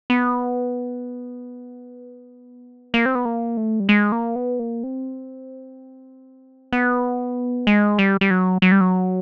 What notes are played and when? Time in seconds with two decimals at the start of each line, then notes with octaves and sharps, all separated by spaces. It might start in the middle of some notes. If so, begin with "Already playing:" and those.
0.10 B3
2.94 A#3
3.06 C4
3.15 B3
3.25 A#3
3.57 A3
3.80 G3
3.89 G#3
4.12 A#3
4.36 B3
4.59 A#3
4.83 C4
6.73 B3
7.67 G#3
7.99 G3
8.21 G3
8.30 F#3
8.62 F#3
8.72 G3
8.81 F#3